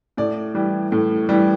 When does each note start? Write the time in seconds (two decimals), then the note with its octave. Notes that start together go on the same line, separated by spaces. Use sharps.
0.17 A2 D5
0.54 E3 G3
0.92 A2
1.29 E3 G3